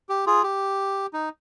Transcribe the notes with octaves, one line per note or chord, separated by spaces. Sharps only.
G4
F4 G#4
G4
D#4